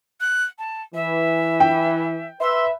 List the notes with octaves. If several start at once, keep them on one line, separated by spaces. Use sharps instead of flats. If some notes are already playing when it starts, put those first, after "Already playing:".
F#6
A5
E3 E5
G5
B4 E5 C6